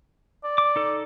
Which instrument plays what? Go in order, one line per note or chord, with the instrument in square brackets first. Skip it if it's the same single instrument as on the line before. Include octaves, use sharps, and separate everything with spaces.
[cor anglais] D5
[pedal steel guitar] D6
D#4 A4